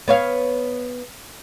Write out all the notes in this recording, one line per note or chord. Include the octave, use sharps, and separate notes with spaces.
B3 C#5 F5